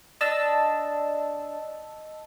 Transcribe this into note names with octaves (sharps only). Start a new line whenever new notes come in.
D4 D#5 A5 E6